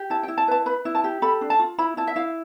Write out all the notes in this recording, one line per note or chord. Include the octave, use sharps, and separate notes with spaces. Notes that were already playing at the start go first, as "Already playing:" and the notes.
Already playing: G4
E4 A5
G5
E4
A5
B4 A5
B4 B5
E4
A5
G4
A4 B5
D4
A5
F4
E4 B5
E4 A5
E5
E4 F5